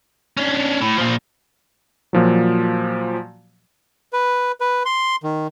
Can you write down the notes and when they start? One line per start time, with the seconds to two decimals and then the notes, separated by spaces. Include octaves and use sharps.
0.37 C#4 D4
0.81 A2
0.97 A#2 F3
2.13 A#2 F3 F#3
4.13 B4
4.61 B4
4.85 C6
5.23 D#3